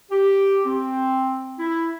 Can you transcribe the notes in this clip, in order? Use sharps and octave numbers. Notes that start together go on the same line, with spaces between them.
G4
C4
E4